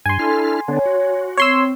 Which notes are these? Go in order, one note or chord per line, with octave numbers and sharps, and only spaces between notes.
G2 G#5 C6
D4 E4 A4 F6
D3 B3 D4 C#5
F#4
C4 C#5 C6 E6